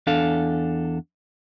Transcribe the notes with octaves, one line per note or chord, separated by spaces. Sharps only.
E2 D4 A4 F5